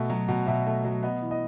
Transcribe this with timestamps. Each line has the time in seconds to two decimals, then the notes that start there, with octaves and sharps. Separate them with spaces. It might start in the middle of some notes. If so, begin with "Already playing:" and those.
Already playing: B2 A3
0.10 F#3
0.28 B2
0.47 B2 E5
0.66 A3
0.85 F#3
1.03 B3 D#5
1.22 E3
1.31 D#5